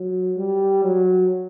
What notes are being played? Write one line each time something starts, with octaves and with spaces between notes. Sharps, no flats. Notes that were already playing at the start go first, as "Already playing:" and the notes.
Already playing: F#3
G3
F#3